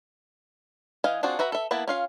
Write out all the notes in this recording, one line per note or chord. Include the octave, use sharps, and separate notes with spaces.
E3 D#5 F5 G#5
C4 D4 F4 F#4 G#4
F#4 B4 E5 A#5
A4 E5
A#3 B3 E4 A5
C#4 F4 F5